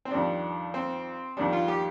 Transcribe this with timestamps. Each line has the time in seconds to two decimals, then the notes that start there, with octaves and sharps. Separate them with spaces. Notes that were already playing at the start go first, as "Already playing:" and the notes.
0.05 C4
0.11 F2 D#3 G3 D4
0.74 C4
1.37 F2 D#3 G3 D4
1.53 F4
1.68 G4